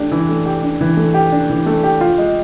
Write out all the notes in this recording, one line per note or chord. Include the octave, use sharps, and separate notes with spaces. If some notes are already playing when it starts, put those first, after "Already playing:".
Already playing: E3 A3 D4 G4
E3
A3
G4
D4
E3
A3
G4
D4
E3
A3
G4
F4
G#3